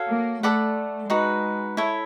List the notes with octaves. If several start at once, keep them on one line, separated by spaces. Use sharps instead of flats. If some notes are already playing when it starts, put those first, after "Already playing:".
Already playing: F#4 A4 C#5 F5
A#3
A3 A4 D5 F#5 B5
G#3 D#4 F#4 B4
E4 A4 C#5 E5